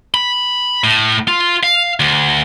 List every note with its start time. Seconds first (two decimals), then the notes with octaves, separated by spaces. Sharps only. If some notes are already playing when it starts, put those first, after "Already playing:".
0.14 B5
0.84 A2
1.28 F4
1.63 F5
2.00 D2